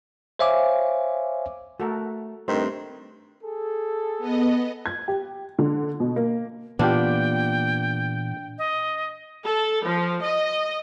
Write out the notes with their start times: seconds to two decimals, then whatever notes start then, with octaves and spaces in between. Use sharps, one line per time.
0.39 C5 C#5 E5 F5 G#5 D6
1.80 A3 F#4 A4 A#4
2.48 G2 D#3 A3 C4 C5
3.43 G#4 A4
4.19 B3 D#5
4.86 G#6
5.08 G4
5.59 D3
6.00 B2
6.16 A#3
6.79 A#2 E3 A#3 B3 D4 F4 G4 G5
8.58 D#5
9.44 A4
9.84 F3
10.21 D#5